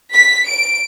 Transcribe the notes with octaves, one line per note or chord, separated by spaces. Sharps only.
B6
D7